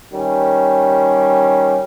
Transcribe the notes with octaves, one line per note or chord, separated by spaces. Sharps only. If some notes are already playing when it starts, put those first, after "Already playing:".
D#3 G3 C#4